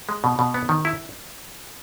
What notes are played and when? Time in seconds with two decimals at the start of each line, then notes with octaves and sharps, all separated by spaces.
0.09 G#3
0.24 B2
0.39 B2
0.54 B3
0.69 D#3
0.85 E4